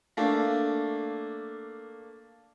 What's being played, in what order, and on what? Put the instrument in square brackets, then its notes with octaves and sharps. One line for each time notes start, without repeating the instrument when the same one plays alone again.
[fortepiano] A3 A#3 D4